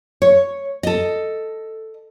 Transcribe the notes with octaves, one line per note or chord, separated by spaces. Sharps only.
C#5
A4 D#5